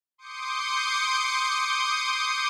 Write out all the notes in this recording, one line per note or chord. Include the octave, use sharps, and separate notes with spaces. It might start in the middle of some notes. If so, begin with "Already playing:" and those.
C6 D6 D#6 G6 C#7